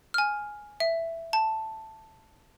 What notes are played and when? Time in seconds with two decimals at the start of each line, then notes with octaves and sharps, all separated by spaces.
0.14 G#5 F6
0.80 E5
1.33 A5